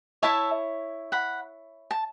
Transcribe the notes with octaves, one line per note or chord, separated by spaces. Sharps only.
E4 C#5 E5 A5
F#5 B5
A5